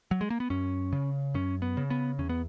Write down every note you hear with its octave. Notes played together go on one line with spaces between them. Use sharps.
F#3
G#3
A#3
B3
F#2 C#4
C#3
F#2 C#4
B3
C#3
B3
E2 C#4
B3